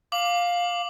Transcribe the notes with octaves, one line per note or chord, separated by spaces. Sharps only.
F5 D6 F#7